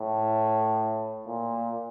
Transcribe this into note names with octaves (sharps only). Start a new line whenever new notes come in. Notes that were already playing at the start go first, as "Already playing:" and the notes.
Already playing: A2
A#2